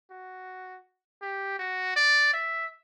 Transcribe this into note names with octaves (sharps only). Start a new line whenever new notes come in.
F#4
G4
F#4
D5
E5